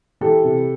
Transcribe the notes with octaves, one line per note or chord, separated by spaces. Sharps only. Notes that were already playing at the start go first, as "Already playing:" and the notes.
E3 G4 A4
C3